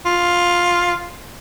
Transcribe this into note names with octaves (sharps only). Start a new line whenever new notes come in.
F4